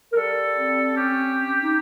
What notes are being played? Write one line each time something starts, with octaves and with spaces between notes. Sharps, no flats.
A#4
G3 A4
C4
C#4 G4
C#4
D#4